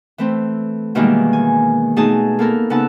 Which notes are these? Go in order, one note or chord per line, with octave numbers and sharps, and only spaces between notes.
E3 A3 C4
B2 D#3 E3 G3 G#3 A#3
G#5
B2 A3 D#4 G#4 G#5 A5
A#3 B3 A4 A#4
C#3 B3 D#4 F#5 A5 E6